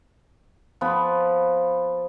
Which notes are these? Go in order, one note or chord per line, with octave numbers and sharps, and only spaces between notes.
F3 B3 B5